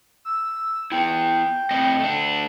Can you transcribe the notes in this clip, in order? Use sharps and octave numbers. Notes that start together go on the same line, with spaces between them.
E6
B3 E4 G5
A2 C4 D#5
A3 D4